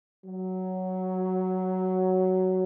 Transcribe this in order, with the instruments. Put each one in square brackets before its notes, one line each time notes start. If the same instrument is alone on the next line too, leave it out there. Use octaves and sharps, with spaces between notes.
[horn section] F#3